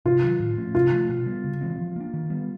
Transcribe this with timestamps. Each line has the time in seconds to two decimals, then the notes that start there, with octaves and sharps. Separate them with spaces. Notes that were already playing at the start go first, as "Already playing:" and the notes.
0.06 C3 F4
0.23 D#3 F#3
0.40 A2
0.58 F3 A3 C#4
0.74 C3 F4
0.92 F3 A3
1.09 B2
1.26 G3 B3
1.44 C#3
1.61 E3 G#3 C4
1.79 F3
1.96 A#3 D4
2.14 D#3
2.30 G3 B3